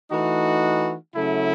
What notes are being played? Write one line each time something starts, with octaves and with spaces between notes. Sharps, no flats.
E3 A3 D#4 F#4
C#3 F#3 A3 E4